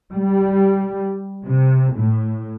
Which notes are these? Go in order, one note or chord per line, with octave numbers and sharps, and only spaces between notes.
G3
C3
A2